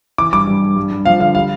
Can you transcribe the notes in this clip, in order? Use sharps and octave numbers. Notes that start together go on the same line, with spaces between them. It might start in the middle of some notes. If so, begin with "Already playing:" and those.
E3 D6
G2 D6
G2
G2
G2
G2
F3 F5
D3 F5
G3 F5